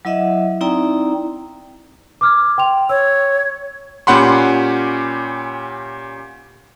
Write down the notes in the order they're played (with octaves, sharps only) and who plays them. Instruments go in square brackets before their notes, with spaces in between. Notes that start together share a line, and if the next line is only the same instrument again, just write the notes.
[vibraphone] F#3 E4 D#5 E5 F#5
C4 D#4 E4 D5 G5 A#5
[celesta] D6 F6 G#6
G5 C6 F7
[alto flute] C#5 [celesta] E6
[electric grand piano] A#2 C#4 G4 F#5 B5 C6